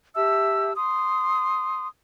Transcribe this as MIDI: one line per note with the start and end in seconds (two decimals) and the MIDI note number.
0.15 0.72 67
0.15 0.72 76
0.15 0.72 81
0.15 0.72 88
0.76 1.86 84
0.76 1.86 87